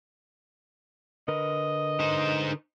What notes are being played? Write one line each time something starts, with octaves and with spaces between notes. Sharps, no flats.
D3 A#4 B4 D#5
D#4 C5